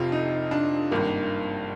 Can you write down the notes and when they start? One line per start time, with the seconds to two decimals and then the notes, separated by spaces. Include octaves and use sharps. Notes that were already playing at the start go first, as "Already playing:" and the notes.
Already playing: F1 F2 C3 F4
0.12 D#4
0.51 D4
0.91 G#1 G2 D#3 A#3